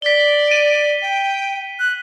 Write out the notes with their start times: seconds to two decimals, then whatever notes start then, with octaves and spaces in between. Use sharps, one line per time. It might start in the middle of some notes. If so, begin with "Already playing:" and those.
0.02 D5 B6 G7
0.51 D#7
1.02 G5
1.79 F#6